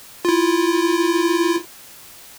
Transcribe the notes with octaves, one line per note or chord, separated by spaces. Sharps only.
E4 F4